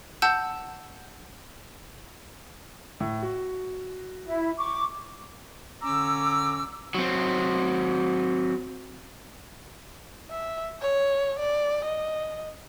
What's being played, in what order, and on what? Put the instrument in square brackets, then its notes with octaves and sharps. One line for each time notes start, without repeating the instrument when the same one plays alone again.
[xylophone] F#5 A5 E6 G6
[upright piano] A2
F#4
[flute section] E4
C#6 D6
[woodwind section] D3 C#4 A#5 D6 E6
[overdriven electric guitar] F#3 C4
[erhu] E5
C#5
D5
D#5